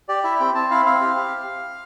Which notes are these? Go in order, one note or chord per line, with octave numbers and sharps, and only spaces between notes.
G4 D5
E4 E5
C4 G5
C4 A5
E4 F5
C4 F5
G4
G4